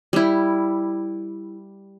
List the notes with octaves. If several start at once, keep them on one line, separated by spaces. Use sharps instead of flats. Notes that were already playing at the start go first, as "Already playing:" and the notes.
G3 E4